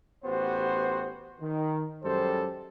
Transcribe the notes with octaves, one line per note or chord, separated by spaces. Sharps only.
A1 B3 F#4 G4 B4 C5
D#3
F#2 G3 G#3 G4 A4 C5